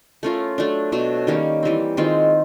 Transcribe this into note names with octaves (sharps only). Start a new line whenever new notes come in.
A3 C#4 F4 A#4
F#3 A3 D4
B2 F#3 A3 D4
D#3 G3 A#3 C#4
E3 G3 C4
D#3 G#3 C4 F4